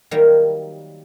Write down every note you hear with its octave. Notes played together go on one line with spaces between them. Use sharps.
D#3 F#3 G3 A#3